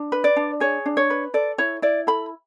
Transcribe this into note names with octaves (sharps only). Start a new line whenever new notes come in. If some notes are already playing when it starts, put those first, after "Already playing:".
Already playing: D4
B4
D5
D4
G#4 C#5
D4
C#5
B4
A4 D5
E4 C#5
E4 D5
A4 B5